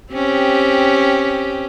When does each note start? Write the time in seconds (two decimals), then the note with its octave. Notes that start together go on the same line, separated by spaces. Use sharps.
0.13 C4 C#4 G4